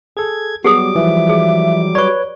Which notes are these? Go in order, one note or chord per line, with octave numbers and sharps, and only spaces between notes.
G#4 A4 G#6
F#3 G3 B3 G4 G#4 D6 D#6
E3 F3 E5
G#4
B4 C#5 D5 C#6